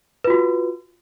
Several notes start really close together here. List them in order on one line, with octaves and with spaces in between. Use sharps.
B4 F4 F#4